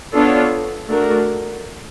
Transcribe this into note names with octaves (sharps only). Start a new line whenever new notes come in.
B3 D4 F4 A4 C#5
A3 D4 F#4 A#4